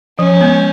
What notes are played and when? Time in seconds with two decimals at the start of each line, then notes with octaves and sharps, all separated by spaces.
0.18 F3 C#4
0.41 G#3 B3